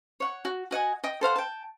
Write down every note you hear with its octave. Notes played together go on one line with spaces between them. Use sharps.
C#5 F#5
F#4
F#4 D#5 F#5 G#5
D#5 G5 D#6
A4 C5 F5 F#5
G5 A5